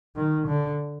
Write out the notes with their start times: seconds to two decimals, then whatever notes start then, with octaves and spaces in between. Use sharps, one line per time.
0.16 D#3
0.47 D3